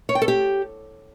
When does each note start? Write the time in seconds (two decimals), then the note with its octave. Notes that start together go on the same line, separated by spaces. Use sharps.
0.09 C#5
0.15 G5
0.22 A4
0.28 G4